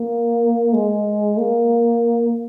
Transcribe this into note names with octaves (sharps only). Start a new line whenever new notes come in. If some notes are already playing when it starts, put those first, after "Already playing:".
Already playing: A#3
G#3
A#3